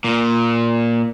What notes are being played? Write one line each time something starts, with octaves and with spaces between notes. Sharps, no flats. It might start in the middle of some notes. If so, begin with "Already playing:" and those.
A#2